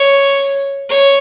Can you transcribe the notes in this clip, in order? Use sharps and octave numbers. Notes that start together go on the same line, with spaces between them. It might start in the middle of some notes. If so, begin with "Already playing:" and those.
Already playing: C#5
C#5